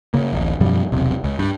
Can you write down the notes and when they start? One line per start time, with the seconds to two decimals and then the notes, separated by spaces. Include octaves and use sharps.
0.14 C#3 A#3
0.33 D1 A1
0.60 F#2 B2 F3 G3
0.92 E1 B1 C3
1.24 C#2
1.39 G2